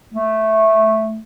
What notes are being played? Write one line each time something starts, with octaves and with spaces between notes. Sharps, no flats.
A3